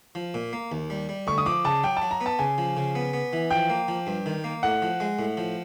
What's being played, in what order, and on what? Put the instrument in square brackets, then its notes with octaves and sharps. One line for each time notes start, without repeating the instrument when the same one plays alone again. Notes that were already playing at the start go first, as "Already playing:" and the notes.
[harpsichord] F3
A#2
A#3
D#2
G3
G3
[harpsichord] D2 [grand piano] C#6
[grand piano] D#6
[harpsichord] F3 [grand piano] D6
[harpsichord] C#3 [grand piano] A5
[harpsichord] F#3 [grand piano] G5
[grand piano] A5
[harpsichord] F#3
[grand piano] A#5
[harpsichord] B3
[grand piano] A5
[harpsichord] C#3 [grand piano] G#5
[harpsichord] F3
C#3
B3
B3
E3
[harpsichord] F3 [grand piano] G5
[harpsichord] A#3
F3
G2
D#3
A#3
[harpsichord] A2 [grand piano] F#5
[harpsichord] F3
G#3
A2
F3